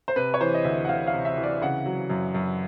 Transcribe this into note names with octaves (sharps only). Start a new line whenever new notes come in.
C5
C3 B4
C#5
E3 C5
D#5
D2 E5
F#5
D2 F5
F5
C3
E5
E3
D5
C#3 F#5
F#3
F#2
F#2